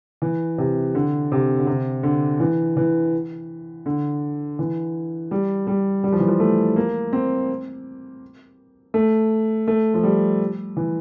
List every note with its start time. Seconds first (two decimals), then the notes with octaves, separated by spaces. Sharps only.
0.22 E3
0.58 C3
0.95 D3
1.32 C3
1.59 D3
1.67 C3
2.03 D3
2.40 E3
2.77 E3
3.86 D3
4.59 E3
5.31 G3
5.67 G3
6.04 G3
6.12 F3
6.20 E3
6.28 F3
6.40 A3
6.76 A#3
7.13 C4
8.94 A3
9.68 A3
9.94 F3
10.03 G3
10.77 E3